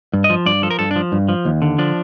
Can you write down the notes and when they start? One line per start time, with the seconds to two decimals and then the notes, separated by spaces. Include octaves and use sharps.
0.13 G2
0.24 D#5
0.30 F3
0.46 G2 D5
0.63 F3 A4
0.71 A#4
0.79 G2 A4
0.91 D4
0.96 F3
1.12 G2
1.29 F3
1.45 D#2
1.62 D3
1.78 F3 D4